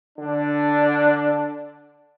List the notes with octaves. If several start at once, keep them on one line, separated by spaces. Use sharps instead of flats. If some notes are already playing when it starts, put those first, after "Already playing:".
D3 D4